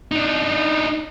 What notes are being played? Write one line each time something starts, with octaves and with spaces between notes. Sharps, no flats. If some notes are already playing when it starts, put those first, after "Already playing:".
D4 D#4